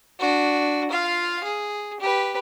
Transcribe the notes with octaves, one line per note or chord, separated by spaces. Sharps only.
D4 F#4
F4 F5
G#4
G4 B4